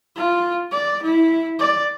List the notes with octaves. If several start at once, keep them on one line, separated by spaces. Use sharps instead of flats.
F4
D5
E4
D5